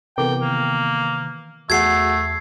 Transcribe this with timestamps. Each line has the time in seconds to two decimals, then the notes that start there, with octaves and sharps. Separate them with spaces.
0.18 C3 E3 B3 A4 A#4 G5 D6
0.42 D#3 A#3
1.70 E2 A3 F#4 G#4 F#5 G#6 C7